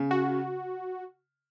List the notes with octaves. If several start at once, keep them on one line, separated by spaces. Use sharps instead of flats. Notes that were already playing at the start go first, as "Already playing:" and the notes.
Already playing: C#3
F#4